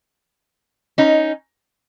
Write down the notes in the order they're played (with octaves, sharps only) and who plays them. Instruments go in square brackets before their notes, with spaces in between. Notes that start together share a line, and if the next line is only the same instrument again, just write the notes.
[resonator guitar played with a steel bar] C#4 D#4